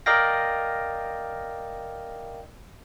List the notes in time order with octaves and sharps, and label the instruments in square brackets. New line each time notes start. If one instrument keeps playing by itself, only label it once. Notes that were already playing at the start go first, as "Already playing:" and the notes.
[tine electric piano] A#4 D5 D#5 F5 G5 A#6